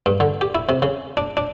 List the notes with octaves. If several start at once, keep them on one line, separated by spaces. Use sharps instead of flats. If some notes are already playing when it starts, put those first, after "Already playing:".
G2
D3
G4
E4
C3
C#3
D4
D4